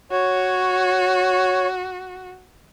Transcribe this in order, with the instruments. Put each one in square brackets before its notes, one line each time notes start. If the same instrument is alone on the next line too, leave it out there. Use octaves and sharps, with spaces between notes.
[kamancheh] F#4 [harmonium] C#5